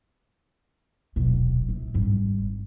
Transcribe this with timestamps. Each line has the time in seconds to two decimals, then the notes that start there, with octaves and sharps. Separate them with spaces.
1.16 D#1 B1
1.69 A#1
1.94 G#1 G2